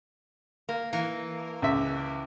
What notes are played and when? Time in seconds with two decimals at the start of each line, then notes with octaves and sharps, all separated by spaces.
0.69 A#3
0.93 E3 A#3
1.62 C#2 E5